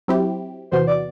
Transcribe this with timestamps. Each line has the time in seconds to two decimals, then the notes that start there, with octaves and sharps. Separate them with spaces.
0.08 F#3 C4 E4 G4
0.71 E2 C3 E3 B3 F#4 C5
0.87 D5